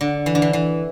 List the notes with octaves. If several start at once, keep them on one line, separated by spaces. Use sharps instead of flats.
D3
E3
D3
E3
E3